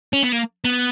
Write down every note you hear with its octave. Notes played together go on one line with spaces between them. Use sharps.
C#4
B3
A#3
B3